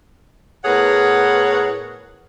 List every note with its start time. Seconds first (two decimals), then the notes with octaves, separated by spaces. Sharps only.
0.65 A2 B3 G#4 A#4 C#5 F#5